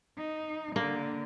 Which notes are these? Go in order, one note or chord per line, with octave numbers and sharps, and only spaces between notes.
D#4
D3 A#3